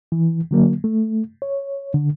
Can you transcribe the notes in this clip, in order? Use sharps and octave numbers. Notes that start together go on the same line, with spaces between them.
E3
D3 F#3 A#3
A3
C#5
D3